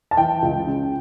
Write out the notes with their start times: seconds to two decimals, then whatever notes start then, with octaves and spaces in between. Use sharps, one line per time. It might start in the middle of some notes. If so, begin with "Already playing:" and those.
0.11 A5
0.17 E3 G5
0.42 C#2
0.67 C#3